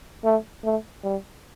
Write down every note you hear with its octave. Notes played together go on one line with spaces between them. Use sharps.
A3
A3
G3